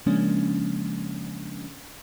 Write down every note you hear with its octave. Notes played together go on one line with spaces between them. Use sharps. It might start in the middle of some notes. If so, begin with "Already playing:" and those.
C#3 F3 G#3 A#3 C#4 D4